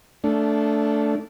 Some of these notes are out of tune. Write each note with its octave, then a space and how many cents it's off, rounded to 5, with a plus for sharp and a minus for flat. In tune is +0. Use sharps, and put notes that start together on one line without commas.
A3 +0 D4 -20